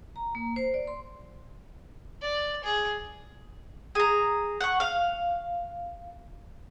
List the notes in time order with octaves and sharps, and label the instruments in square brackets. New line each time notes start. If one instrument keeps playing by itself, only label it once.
[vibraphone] A#5
A#3
C5
D5
C6
[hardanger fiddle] D5
G#4
[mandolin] G#4 A#5
F#5 C#6
F5